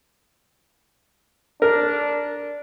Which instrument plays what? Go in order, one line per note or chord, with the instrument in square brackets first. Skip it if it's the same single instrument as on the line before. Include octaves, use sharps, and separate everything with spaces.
[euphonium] D4 [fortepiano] A#4